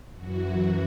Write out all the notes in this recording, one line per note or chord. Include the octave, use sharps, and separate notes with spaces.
F#2 E3 F#4